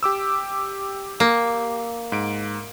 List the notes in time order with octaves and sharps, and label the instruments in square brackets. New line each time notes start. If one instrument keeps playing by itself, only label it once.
[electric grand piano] G4 D6 E6
[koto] A#3
[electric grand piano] G#2 D7